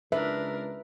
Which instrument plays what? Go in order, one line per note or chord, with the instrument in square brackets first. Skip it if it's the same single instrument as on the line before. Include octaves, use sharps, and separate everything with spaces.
[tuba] C#2 [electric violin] D4 A#4 [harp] B4 [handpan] E5